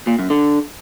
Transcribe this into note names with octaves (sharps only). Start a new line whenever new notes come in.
A#2
F#2
D3